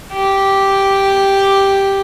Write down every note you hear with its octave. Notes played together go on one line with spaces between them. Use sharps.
G4